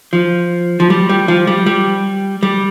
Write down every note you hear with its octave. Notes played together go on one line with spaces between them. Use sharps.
F3
F3
G3
G3
F3
G3
G3
G3